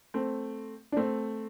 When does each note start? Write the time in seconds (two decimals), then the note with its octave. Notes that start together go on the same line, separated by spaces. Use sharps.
0.14 A3 C4
0.92 D4
0.97 A3 C4